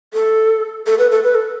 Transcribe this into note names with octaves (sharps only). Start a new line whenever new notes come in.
A4
A4
B4
A4
B4
A4